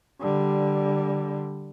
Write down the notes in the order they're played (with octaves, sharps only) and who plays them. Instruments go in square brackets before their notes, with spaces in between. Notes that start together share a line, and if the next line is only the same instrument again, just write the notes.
[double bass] D3 G3